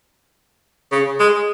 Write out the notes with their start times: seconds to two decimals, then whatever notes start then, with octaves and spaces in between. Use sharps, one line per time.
0.92 C#3
1.20 G#3